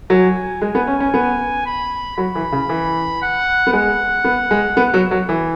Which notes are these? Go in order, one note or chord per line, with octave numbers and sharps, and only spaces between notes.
F#3 G#5
G#3
B3
C#4
C#4
B3
B5
F#3 B5
E3
C#3
E3
F#5
B3
G#3 F#5
B3
G#3
B3
F#3
F#3
E3